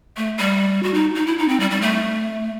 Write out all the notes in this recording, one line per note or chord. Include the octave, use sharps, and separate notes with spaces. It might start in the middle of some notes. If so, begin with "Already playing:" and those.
A3
G3
F#4
D#4
D#4
E4
D#4
C4
G3
G3
A3